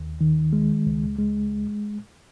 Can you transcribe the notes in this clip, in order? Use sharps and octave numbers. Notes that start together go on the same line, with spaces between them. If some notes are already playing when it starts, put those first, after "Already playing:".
Already playing: D#2
D#3
G#3
C#2
G#3